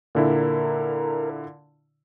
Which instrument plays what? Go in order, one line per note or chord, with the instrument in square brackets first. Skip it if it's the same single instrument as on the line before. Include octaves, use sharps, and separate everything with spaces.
[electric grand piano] A#2 D3 E4 [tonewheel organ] A#4